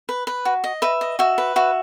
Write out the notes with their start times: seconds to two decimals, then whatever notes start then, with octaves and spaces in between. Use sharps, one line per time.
0.09 B4
0.27 B4
0.45 F#4
0.64 D#5
0.82 B4 E5
1.01 D#5
1.19 F#4 E5
1.38 B4
1.56 F#4 E5